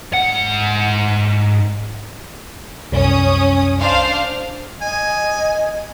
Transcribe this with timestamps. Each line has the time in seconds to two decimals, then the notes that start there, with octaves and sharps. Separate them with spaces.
0.14 G#2 F#5
2.92 C2 F#2 C#4 D#6
3.79 D4 C5 F5
4.82 D#5 G#5